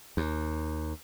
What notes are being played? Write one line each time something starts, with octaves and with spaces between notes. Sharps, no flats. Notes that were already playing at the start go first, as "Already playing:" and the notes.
D#2